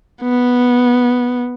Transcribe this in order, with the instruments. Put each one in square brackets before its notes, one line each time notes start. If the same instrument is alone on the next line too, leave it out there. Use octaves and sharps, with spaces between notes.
[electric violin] B3